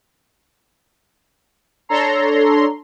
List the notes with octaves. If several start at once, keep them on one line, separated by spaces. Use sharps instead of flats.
D4 A4 C#5 A#5 C6